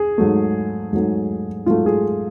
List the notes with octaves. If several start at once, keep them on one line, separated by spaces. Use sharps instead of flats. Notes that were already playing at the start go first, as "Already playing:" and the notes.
Already playing: G#4
G#2 F#3 A3
G#2 F#3 A3
G#2 F#3 A3 F4
G#4